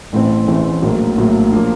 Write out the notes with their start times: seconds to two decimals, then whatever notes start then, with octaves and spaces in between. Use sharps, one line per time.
0.13 A1 A2 E3 A3 C4
0.47 A1 A2 E3 A3 C4
0.82 A#1 A2 F#3 A#3
1.17 A#1 A2 F#3 A#3
1.52 F3 A#3 D4